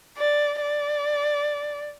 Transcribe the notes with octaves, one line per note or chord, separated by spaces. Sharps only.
D5
D5